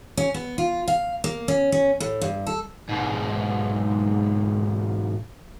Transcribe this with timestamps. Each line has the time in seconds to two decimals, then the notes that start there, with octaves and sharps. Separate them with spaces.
0.17 C#4
0.34 B3
0.58 F4
0.88 F5
1.24 A#3
1.48 C#4
1.72 C#4
2.00 A2
2.21 G2
2.47 A4
2.89 G#2 B2